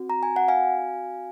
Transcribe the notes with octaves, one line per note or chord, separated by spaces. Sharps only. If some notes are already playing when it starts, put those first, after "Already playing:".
Already playing: C4 F#4
A#5
G#5
F#5
F5 G#5